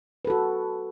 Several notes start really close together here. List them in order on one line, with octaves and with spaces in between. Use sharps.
B4 A4 F#4